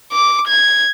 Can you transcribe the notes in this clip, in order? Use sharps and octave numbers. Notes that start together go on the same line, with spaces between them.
D6
G#6